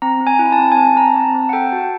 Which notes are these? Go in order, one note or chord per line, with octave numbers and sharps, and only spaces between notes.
C4 A#5
C4
G#5
E4
A5
C4
G#5
C4 A5
C4 A#5
C4 A5
C4
F#5
A4 G5
F#4 A5